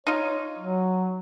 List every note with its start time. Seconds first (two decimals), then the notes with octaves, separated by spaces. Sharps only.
0.07 D#4 F4 C#5
0.59 F#3